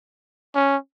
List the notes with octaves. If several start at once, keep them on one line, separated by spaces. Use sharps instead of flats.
C#4